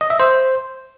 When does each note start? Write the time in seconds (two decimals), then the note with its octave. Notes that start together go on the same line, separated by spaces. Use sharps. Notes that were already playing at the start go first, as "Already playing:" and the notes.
0.01 D#5
0.10 E5
0.20 C5